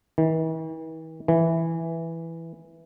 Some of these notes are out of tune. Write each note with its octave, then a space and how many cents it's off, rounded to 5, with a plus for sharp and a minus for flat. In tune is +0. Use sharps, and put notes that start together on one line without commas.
E3 -45
E3 +0